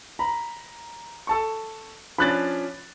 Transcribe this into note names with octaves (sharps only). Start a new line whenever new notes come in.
A#5 B5
A4 A5 C#6
F3 C#4 D4 B5 F#6 A6